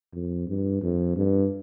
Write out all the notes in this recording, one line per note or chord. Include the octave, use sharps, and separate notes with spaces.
F2
G2
F2
G2